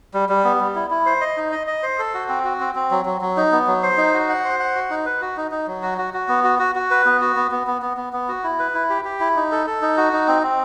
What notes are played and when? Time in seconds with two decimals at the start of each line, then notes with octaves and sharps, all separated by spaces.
0.14 G3
0.29 G3
0.44 B3
0.61 G3
0.75 E4
0.90 E4
1.06 C5
1.21 D#5
1.37 D#4
1.52 D#5
1.67 D#5
1.83 C5
1.99 A4
2.14 F#4
2.29 C4
2.45 F#4
2.60 C4
2.75 C4
2.91 F#3
3.05 F#3
3.21 F#3
3.37 D#4
3.52 B3
3.67 F#3
3.83 C5
3.98 D#4
4.14 F#4
4.29 F#5
4.44 C5
4.60 F#5
4.75 F#4
4.90 D#4
5.06 B4
5.21 F#4
5.37 D#4
5.51 D#4
5.67 F#3
5.83 F#4
5.98 F#4
6.14 F#4
6.28 B3
6.44 F#4
6.59 F#4
6.75 F#4
6.91 B4
7.05 B3
7.21 F#4
7.36 B3
7.51 B3
7.67 B3
7.82 B3
7.97 B3
8.13 B3
8.28 F#4
8.44 E4
8.59 B4
8.74 E4
8.90 G4
9.05 G4
9.20 E4
9.36 D#4
9.52 A4
9.67 A4
9.82 D#4
9.97 F#4
10.13 D#4
10.28 C4
10.43 C4